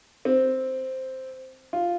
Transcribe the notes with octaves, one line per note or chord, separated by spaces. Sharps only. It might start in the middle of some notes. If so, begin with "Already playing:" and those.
C4
F4